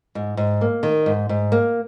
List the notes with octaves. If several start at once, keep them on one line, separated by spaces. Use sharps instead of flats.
G#2
G#2
A#3
D#3
G#2
G#2
A#3